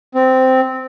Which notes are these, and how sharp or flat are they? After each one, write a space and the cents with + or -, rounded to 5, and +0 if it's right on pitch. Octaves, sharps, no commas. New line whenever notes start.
C4 -10